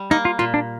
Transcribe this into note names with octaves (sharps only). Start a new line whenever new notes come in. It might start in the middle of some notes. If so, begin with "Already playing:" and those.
Already playing: G3
A#3 D#4
F4
A#2 F4
D4